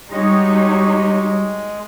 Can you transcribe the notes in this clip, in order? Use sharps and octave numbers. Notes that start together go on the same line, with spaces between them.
G3 G#3 D#4 F#4 G4 C#5 D#6